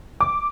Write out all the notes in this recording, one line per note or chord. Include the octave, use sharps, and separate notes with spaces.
D6